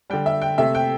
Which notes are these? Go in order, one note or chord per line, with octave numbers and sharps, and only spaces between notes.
D3 G3 G5
E5
G5
C3 A3 E5
G5